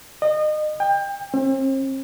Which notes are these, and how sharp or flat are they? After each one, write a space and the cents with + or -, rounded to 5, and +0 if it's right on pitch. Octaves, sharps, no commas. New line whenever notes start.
D#5 -30
G5 +30
C4 +40